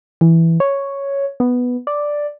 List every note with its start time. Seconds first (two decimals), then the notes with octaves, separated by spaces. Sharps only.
0.21 E3
0.60 C#5
1.40 B3
1.87 D5